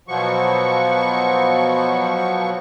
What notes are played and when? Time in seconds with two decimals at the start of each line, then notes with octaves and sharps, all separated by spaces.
0.08 B2 F3 F#3 C#6